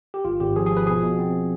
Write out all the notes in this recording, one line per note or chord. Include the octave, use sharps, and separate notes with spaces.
G4
G#1 F4
G#1 G4
F3 G#4
G#4
F3 B4
B2 G#4
B2
C4